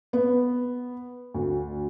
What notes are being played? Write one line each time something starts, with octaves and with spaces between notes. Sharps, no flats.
B3
D2